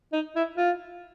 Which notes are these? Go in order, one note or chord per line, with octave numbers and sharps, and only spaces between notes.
D#4
E4
F4